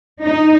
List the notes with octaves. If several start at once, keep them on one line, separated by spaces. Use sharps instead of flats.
D#4